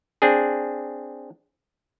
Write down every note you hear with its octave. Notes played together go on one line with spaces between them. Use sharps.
C4 D4 G#4